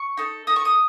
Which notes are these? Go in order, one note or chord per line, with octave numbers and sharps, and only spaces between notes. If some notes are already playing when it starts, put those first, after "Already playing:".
Already playing: C#6
D#4 A4
D#4 A4 D#6
C#6
D#6